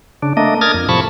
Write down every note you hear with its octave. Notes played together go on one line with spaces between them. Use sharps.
C#3 D4
A3 A#3 D4 D#5
A#4 D#6 F6 G#6 A6
F2
A2 C3 F3 A5 B5 C#6